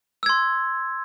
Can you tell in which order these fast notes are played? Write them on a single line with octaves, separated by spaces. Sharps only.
E6 G#6 C6